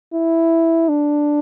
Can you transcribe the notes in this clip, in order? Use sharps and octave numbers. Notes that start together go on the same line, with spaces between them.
E4
D4